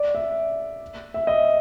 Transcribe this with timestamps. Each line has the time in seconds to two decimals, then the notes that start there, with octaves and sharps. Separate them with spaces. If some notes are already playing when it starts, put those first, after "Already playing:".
Already playing: D5
0.15 E5
1.14 E5
1.27 D#5